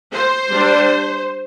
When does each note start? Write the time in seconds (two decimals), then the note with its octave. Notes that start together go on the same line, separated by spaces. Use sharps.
0.14 C5
0.52 G3 D4